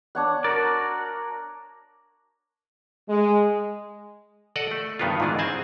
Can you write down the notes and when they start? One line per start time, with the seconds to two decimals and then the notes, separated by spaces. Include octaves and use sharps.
0.15 D4 C#5 F#5
0.44 F#4 A#4 D5
3.09 G#3
4.56 A4 D5 D#5 F#5
4.71 A3
4.99 G2 D#3 B3 D#4 F4
5.20 G#2 D#3 E3 D4 G#4
5.39 C4 G#4 D#5 G#5 A5